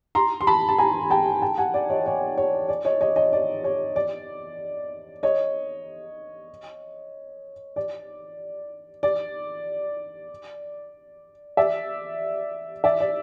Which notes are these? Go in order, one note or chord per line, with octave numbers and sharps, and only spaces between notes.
A#5 C6
C6
A5 B5
A5
G#5 A#5
G5 A5
G5 A5
F#5 G#5
D5
C#5 D#5
C#5
C#5
D5
C#5 D#5
C#5 D#5
C#5 D#5
D5
C#5
D5
C#5 D#5
D5
D5
D5 E5
D5 E5
D5